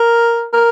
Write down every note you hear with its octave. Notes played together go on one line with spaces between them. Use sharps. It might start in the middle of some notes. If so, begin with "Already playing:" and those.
Already playing: A#4
A#4